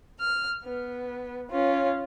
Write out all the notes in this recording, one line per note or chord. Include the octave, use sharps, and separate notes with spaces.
F6
B3
C#4 F4